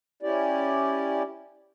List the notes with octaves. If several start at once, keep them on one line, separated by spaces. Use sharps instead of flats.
C#4 E4 G4 D5